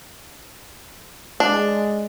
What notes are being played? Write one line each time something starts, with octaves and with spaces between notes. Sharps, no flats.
G#3 D4